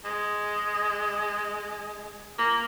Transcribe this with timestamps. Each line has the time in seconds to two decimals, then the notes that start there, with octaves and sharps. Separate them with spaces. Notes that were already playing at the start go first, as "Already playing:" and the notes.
0.05 G#3
2.38 A#3